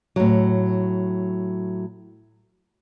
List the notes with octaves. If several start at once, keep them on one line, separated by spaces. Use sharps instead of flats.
A2 F#3